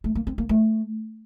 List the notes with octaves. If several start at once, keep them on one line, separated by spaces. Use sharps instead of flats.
A3
A#3
C4
A#3
A3